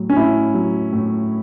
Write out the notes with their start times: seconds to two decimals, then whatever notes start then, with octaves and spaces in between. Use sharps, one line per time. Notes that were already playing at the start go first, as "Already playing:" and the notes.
Already playing: A2 F#3
0.10 C#4
0.16 A2 E4
0.54 F#3
0.93 A2